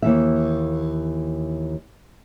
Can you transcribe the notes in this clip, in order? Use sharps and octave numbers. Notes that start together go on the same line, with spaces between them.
D#2 E3 E5